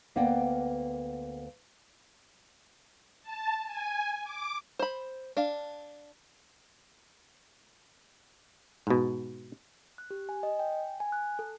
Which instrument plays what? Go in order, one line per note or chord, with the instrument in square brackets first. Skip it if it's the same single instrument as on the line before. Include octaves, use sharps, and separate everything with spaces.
[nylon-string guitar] D2 A#3 B3 D5 F#5 G5
[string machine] A5
G#5
D6
[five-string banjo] C5 B5
D4 F5
[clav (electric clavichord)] G#2 B2
[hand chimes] F#6
G4
G#5
D#5
G5
G#5
G#5
F#6
A4